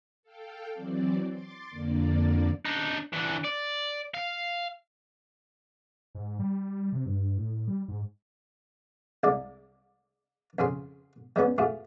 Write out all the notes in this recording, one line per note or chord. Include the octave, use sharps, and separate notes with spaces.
A4 F5 G5
E3 F#3 C4 D5
C6 D6 A6
F2 D3 A#3 D5
D4 D#4
E3 D4
D5
F5
G#2
G3
C3
G2
A2
G3
G#2
C2 G#3 D5
F2 C#3 G#4 C6
G3 G#3 B3 C#4
A3 F4 F#4 G#4